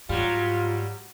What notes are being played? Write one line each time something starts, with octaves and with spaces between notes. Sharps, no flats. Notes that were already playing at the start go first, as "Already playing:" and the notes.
G#2 F#3 G3 F4